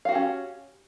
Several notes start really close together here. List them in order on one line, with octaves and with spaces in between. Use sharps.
F5 F#4 G4 C#4